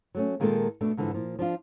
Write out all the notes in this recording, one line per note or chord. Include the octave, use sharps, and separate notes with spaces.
F#3 A3 C#4
A#2 D#3 G#3 A#3 F4 A4
B2 A3 D4
G#2 D3 E3 F3
A#2 F3
F3 D4 F4